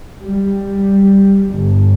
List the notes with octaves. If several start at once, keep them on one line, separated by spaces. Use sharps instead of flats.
G3
G1